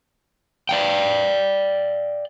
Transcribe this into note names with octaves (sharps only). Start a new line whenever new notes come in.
D5 F5 G5